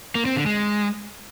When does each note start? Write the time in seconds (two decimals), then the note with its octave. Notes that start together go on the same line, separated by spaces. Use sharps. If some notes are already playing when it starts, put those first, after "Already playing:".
0.15 A#3
0.26 C4
0.36 D3
0.46 G#3